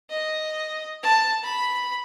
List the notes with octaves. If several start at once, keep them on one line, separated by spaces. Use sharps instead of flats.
D#5
A5
B5